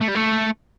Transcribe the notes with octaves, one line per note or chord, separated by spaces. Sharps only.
A3
G3
A3